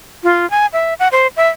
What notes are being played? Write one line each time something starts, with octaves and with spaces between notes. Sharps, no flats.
F4
G#5
E5
F#5
C5
E5